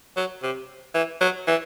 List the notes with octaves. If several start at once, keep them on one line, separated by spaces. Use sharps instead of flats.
F#3
C3
E3
F#3
E3